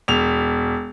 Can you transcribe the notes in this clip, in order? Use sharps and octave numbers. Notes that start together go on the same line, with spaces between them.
E1 F7